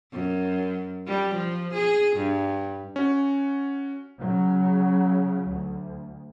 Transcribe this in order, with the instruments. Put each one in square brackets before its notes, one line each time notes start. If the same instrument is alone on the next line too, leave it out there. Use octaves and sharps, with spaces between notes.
[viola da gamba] F#2
G3
F3
G#4
G2
[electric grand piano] C#4 F#4
[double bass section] C#3 F#3
D2